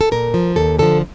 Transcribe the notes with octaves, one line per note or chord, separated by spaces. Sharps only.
A4
A#2 A#4
F3
D#2 A4
D3 F3 A4